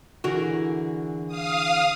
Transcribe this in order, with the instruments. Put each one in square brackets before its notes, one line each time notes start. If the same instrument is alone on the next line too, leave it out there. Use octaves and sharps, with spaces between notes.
[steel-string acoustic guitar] D3 E3 G#4 [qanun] F#4 A#4
[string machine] F5 D#6